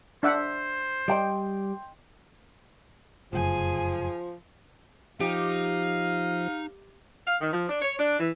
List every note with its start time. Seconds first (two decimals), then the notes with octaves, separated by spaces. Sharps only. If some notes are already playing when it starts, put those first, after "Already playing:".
0.23 D4 C5 E5 F#5
1.08 G3 D5 D#5 G5 C6
3.33 F1 F#2 C#3 F3 G#4 G#5
5.20 F3 D#4 G4 F5
7.27 F5
7.40 D#3
7.52 F3
7.69 D4
7.81 C#5
7.98 D4
8.19 E3